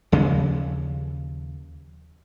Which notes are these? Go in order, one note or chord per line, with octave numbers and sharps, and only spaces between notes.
D#2 C#3 F3 C#4